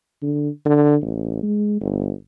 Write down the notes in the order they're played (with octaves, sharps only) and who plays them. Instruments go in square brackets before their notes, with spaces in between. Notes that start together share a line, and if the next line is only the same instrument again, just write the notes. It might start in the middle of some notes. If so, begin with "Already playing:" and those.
[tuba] D3
D3
A1
G#3
G1